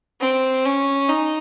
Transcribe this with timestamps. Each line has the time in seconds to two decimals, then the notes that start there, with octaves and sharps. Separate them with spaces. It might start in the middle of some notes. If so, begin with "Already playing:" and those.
0.21 C4
0.66 C#4
1.09 D#4